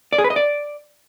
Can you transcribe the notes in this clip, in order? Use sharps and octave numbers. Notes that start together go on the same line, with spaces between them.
D5
G#4
B4
D#5
D5